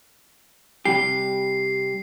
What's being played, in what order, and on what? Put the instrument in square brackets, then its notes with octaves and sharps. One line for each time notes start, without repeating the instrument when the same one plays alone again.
[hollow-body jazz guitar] C3 G3 G4 [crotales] C7